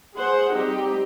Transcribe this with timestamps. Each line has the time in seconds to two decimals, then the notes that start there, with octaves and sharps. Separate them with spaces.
0.16 G#4 C5 F#5
0.54 G3 C4 D#4 G4